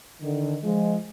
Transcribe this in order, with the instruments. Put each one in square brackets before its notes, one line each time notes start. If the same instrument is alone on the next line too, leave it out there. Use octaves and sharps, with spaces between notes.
[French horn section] D3 D#3
F3 G#3